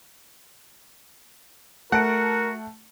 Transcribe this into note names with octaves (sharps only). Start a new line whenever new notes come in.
A3 F#4 A#4 F#5 A5 D7